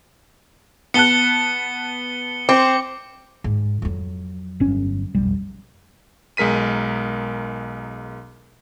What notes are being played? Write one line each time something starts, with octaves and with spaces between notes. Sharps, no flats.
B3 A5 F#6 C#7 G7
C4 C5 D6
G#2
F2 F#3
G1 C#4
F1 B1 G3
B1 G#3 A#4 B6 D#7